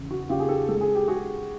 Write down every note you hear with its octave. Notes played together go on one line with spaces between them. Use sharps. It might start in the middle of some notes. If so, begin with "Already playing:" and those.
Already playing: E2 C#3
F#4
C#3 F4 G4
G#4
G4 A4
G#3 A4
G#4
G4
F#4 G#4